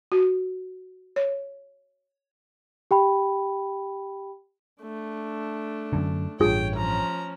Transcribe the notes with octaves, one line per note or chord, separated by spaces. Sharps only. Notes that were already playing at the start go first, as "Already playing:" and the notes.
F#4
C#5
G4 G5 B5
A3 D4
F#2 D3
A1 G2 F4 G#4 C#5 G5
F3 C#4 A#5